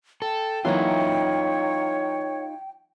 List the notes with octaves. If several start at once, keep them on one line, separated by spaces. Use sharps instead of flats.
A4 G5
E3 F#3 A#3 D#4 F4 C#5